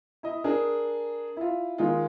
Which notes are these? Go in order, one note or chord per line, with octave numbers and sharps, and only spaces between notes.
E4 D#5
D4 G#4 A#4
E4 F4
D#3 G#3 D#4 F4